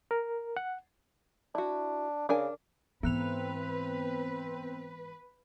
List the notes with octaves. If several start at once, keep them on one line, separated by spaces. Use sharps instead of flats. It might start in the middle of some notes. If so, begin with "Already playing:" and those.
A#4
F#5
D4 E4 F#4
C#3 D4 A#4 G#5
G#2 E3 B3 C4 B4 F#6 F7